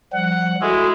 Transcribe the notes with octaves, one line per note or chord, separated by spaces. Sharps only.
F3 G3 F#5
G#3 E4 F#4 A4